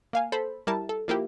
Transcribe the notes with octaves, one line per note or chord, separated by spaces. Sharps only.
A#3 F5 G#5
A4 C5 B5
G3 E4 A#4 A5
A4
F3 A#3 E4 G4